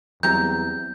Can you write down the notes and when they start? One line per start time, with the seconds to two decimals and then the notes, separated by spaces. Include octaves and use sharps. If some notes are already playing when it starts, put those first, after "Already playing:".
0.23 E2 C3 F#3 G3 C4 G4 A#5 G6